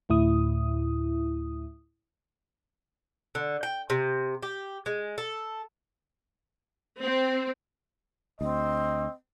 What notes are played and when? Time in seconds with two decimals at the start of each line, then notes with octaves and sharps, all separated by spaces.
0.09 D2 A2 E4 D#6
3.35 D3
3.63 G5
3.90 C3
4.43 G4
4.86 G#3
5.18 A4
7.01 C4
8.41 D2 C4 D#5